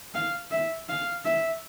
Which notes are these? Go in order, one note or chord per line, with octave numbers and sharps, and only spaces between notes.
F5
E5
F5
E5